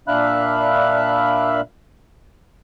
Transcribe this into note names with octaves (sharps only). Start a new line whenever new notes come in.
A#2 D4 E5 F5 B5 F#6